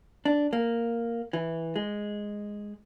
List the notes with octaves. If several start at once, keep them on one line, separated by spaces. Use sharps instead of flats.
D4
A#3
E3
G#3